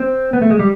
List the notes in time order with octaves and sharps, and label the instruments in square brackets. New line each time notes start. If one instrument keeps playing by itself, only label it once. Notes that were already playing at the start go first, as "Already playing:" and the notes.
Already playing: [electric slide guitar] C4
B3
A3
G#3
G3